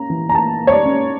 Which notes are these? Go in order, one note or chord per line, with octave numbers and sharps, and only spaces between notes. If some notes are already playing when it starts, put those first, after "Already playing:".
Already playing: A#3 C#4 A#5
E3
A#5
A#3 A5
A#3
C#5
D5
C#4